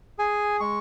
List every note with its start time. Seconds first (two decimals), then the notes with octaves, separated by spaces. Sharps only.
0.18 G#4 G#5
0.60 G#3 C#6